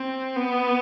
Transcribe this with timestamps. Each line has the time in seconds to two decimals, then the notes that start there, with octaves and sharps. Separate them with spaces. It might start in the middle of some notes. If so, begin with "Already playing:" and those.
Already playing: C4
0.36 B3